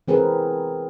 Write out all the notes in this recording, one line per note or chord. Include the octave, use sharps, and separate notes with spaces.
E3 C4 G#4 A#4 B4